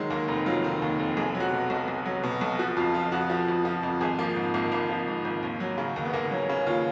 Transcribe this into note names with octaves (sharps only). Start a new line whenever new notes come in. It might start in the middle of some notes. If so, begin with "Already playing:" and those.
Already playing: D#3 F#3 G#3
D#2 A#3
F1 D#4
F#3 F4
D#3
D#2
F1
B1 G#4
F#3
F#4
B2
B1
B1
F#3
B2
B1
F3 F#4
F2 F4
F3 F4
F2 F#4
F3
F2
F3
F2
G#1 G#4
F3 A#3
G#2
G#1 A#3
G#1 A#3
F3
G#2
G#1
D#2
F#3
C#3
D#2
B3
D#2 A#3
F#3 C#4
C#3 C#4
D#2 F4